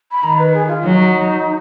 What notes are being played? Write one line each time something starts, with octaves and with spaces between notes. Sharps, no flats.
B5
D#3 A#5
B4
G#4
F4
F#3 D#4